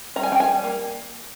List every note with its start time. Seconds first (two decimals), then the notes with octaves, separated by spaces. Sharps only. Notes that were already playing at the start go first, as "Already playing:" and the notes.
0.16 G3 A#5
0.23 G#5
0.32 C#4 G5
0.40 G#5
0.48 G3
0.64 A#3